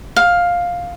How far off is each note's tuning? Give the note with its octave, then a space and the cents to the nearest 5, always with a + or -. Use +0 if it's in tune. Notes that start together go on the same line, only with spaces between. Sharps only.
F5 +10